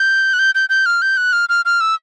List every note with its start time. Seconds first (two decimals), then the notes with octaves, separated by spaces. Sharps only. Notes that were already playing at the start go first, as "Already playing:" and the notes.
Already playing: G6
0.33 F#6
0.39 G6
0.55 G6
0.69 G6
0.86 F6
1.02 G6
1.17 F#6
1.33 F6
1.49 F6
1.65 F6
1.81 E6